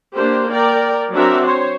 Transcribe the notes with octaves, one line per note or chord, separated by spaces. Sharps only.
A#3 D4 G4 C5
A#4 D5 G5
F#3 C4 D4 F#4 A#4 E5
C5 C#5